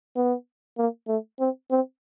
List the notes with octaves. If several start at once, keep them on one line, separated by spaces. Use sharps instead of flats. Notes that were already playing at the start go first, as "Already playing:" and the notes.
B3
A#3
A3
C4
C4